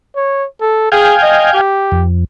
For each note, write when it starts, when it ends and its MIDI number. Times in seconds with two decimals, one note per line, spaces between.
0.16 0.46 73
0.61 0.91 69
0.92 1.15 68
0.92 1.61 77
0.92 1.61 79
0.92 1.61 80
1.22 1.49 75
1.53 2.05 67
1.92 2.24 41